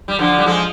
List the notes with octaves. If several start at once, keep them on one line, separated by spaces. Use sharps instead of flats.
G3
D3 F3
G3
F3 G#3